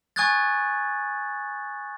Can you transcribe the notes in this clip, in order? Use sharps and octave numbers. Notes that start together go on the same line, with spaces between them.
G#5 C#6 D#6 F#6 G#6 A6